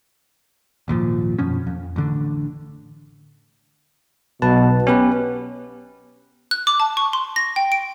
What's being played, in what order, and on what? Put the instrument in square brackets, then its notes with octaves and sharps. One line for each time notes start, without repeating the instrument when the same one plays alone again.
[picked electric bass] G#1 D#2 A#2 F3
F#2 B2 F3 C#4
F2
A1 D3 D4
[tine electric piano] B1 B4 A5 [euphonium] B2
[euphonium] B3 [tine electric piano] C#4 G4 B4
[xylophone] F#6
D6
A5
C#6
C6
A#6
G5
D7